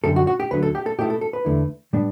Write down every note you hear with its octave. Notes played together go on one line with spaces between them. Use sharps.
F#2 D3 G3 A4
F#4
F#4
G4
D2 D3 F#3 B4
A4
G4
A4
B2 A3 E4 G4
A4
A4
B4
E2 D3 A3 E4
A2 G3 B3 D4